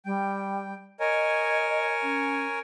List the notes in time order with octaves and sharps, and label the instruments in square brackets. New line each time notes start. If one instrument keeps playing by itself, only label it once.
[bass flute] G3 [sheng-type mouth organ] G5
[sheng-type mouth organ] A#4 C#5 G#5 [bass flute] D#5
[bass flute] C#4